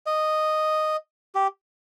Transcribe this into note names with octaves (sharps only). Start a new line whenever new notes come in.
D#5
G4